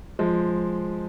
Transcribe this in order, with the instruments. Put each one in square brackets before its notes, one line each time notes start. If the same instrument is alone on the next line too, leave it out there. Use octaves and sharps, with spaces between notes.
[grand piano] F3 G#3